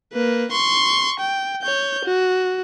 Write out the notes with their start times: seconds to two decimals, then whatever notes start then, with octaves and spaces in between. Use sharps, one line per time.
0.13 A#3 B4
0.52 C6 C#6
1.20 G5
1.62 C#5 G6
2.05 F#4